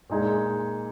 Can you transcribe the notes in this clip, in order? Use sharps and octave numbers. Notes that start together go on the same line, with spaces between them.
A#2 G#3 D#4 G#4